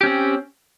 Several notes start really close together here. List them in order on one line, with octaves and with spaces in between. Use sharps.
G4 C#4 C4